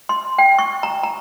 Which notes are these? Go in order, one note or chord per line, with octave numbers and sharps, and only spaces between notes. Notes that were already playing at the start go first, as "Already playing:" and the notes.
C6
G5
C#6
A#5
A#5